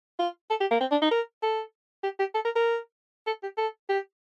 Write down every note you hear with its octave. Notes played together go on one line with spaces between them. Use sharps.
F4
A4
G4
A#3
C4
D4
D#4
A#4
A4
G4
G4
A4
A#4
A#4
A4
G4
A4
G4